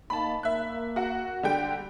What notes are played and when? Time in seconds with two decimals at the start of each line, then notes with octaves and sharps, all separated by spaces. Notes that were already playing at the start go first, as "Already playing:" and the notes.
0.10 A#3 D#4 A5 B5
0.43 A#3 E5 F#6
0.96 F#4 F#5
1.43 D3 G3 G5